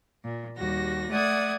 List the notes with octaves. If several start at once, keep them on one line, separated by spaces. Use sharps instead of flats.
A#2
D#2 G3 F#4 A#6
A3 D5 F#5 D#6 G#6